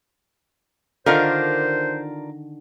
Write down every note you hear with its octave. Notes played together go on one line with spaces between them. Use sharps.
D3 D#3 D4 F4 A#4 C5